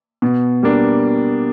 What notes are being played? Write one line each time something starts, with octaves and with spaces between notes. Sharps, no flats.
B2
G3 A#3 D4